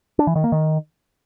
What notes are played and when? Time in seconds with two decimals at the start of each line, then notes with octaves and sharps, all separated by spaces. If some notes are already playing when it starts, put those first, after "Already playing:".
0.19 D4
0.27 E3
0.35 D#3
0.44 A#3
0.52 D#3